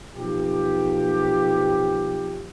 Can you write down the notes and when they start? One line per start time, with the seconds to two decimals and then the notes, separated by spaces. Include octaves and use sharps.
0.16 B1 F3 G4